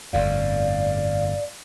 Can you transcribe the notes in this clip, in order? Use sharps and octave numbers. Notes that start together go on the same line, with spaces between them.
G1 F2 A2 D5 F5